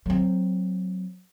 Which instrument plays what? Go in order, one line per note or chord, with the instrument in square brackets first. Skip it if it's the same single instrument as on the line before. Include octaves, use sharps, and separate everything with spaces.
[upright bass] F#3 C4